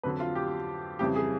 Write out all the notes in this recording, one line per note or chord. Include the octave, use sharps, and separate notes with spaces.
F2 D3 F#3 B4
F4
G4
F2 C#3 E3 G3 G4
G#4